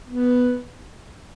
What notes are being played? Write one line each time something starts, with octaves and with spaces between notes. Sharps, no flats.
B3